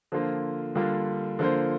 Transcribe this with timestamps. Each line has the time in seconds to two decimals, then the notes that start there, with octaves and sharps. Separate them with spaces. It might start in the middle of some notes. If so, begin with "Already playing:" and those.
0.12 D3 F3 A#3 F4 C5
0.75 D3 G3 A#3 D4 F4
1.39 D3 F3 A#3 F4 C5